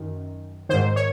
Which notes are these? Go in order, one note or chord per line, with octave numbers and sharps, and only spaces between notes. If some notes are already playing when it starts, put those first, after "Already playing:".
Already playing: F#2 D#3
G#2 D#3 C5
C#5